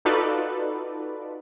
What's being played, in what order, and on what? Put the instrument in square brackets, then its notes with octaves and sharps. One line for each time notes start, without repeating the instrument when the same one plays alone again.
[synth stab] D#4 F4 F#4 A4 B4 D5